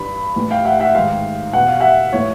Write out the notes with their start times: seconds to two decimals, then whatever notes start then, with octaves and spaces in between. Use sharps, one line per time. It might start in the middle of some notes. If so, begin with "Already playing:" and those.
Already playing: G2 E3 B5
0.36 A2 E3
0.51 F5 G5
0.65 E5 F#5
0.80 E5 F#5
0.95 G#2 D#3 F5 G5
1.53 E2 B2 F#5
1.68 F5
1.80 E5 F#5
2.13 A2 E3 C#5